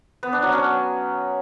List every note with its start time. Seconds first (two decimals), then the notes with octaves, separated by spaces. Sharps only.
0.23 B3
0.33 D4
0.43 F#3
0.53 C#4